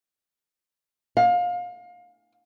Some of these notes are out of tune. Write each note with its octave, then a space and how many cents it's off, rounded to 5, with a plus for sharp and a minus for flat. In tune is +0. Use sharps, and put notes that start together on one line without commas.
F5 +30